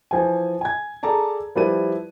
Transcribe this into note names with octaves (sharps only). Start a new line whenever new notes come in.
E3 F3 G#5
G#5 G#6
G#4 A4 D5 A5 A#5
F3 G3 E4 B4 D5 D#7